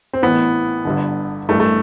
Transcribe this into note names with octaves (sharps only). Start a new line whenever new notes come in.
C4
A1 A2 E3 B3
G1 G2 D3
A1 G2 E3 A3
A3